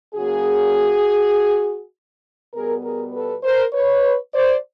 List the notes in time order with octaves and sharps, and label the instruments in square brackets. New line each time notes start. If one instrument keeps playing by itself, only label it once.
[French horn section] C#3 F#3 A#3 F#4 G#4
B2 G3 B3 G#4 A#4
G#4 A#4
A4 B4
A#4 C5
B4 C#5
C5 D5